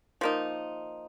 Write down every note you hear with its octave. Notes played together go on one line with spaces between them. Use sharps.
F3 A#3 D#4